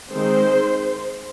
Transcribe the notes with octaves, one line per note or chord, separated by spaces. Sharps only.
D#3 G#3 C4 C5